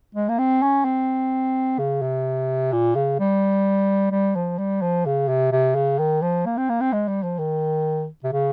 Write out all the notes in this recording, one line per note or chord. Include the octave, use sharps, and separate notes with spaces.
G#3
A#3
C4
C#4
C4
C#3
C3
A#2
C#3
G3
G3
F3
G3
F3
C#3
C3
C3
C#3
D#3
F3
A#3
C4
A#3
C4
G#3
G3
F3
D#3
C3
C#3